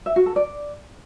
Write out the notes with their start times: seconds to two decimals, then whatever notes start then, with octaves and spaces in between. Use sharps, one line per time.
0.06 E5
0.16 F#4
0.26 A4
0.36 D5